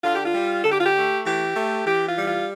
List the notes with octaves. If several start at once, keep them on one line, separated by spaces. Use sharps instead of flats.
D3 F4
G4
F4
G3
D3 A4
G4
F4
G4
A3
E3 G4
A3
E3 G4
F4
G3
F4